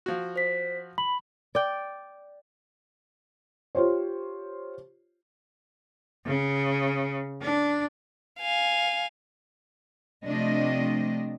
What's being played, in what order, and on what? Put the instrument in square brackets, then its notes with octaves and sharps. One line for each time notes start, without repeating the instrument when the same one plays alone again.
[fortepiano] F3 F#4
[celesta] C5 B6
[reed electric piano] B5 [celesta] F#7
[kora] D5 G5
[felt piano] F4 G4 C5 C#5
[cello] C#3
D4
[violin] F5 G#5
[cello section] C3 F3 A3 D4 D#5